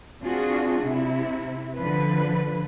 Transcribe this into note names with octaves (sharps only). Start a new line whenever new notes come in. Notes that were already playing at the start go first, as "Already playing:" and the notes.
C4 D4 F4 F#4 G#4
C3 E4
D3 F3 B4